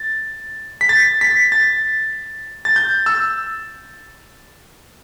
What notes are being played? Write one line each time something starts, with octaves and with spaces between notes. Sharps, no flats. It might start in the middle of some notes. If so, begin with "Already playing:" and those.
Already playing: A6
B6
A6
B6
A6
A6
G6
E6